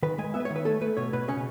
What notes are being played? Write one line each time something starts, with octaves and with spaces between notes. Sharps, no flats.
D#3 B4
G#3 G#5
B3 E5
B4
C#5
D#3
B4
A3 A4
A3 B4
B2 C#5
B2 B4
C#3 C#4